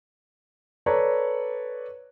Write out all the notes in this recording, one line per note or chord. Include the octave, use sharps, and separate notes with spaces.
A4 B4 C#5 D5 A#5